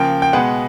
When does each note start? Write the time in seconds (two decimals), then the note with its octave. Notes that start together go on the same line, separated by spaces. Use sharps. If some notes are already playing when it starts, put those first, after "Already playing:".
Already playing: C#3 F3 A#3 G5
0.22 G5
0.33 B2 G#3 B3 F#5